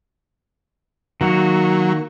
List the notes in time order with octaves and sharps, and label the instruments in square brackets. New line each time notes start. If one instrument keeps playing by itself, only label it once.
[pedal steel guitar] D#3 A#3 F#4 [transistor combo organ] F#3